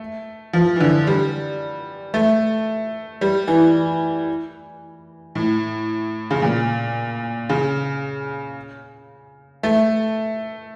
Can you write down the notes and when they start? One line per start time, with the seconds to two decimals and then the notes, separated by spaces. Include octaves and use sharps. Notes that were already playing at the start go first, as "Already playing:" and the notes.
Already playing: A3
0.53 F3
0.76 E3
0.81 D3
1.07 G3
2.14 A3
3.21 G3
3.48 E3
5.35 A2
6.31 C#3
6.42 A#2
7.49 C#3
9.63 A3